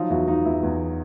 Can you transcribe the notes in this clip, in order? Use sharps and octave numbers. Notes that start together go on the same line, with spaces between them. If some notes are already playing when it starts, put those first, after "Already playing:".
Already playing: F3 F#3 D#4 F4
E2 E4 F#4
E2 D#4 F4
E2 E4
E2